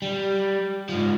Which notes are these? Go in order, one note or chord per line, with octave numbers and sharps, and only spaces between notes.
G3
G#2 F3